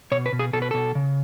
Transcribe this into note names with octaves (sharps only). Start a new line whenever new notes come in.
B2 C#5
B4
B2
G#4
B2 A4
B4
B2 A4
C#3